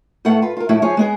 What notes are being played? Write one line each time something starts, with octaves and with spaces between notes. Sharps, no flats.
A2 A3 B3 A4 F#5
F4 B4
F4 A#4
A2 F3 A3 E4 F#4
F3 F4 G#4 C5 C#5
G#3 B3 G#4